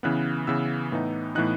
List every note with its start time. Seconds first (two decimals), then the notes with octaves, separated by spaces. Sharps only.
0.03 C#3 E3 B3 F#6
0.47 C#3 E3 B3 E6
0.92 A2 E3 B3 D#4
1.35 A2 E3 B3 D#4 F#6